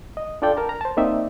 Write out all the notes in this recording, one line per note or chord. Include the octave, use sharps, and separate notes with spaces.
D#5
D4 F4 A4 D5 G5
A#4 A5 A#5
A#5
C5 A5
A#3 C4 D#4 D5 E5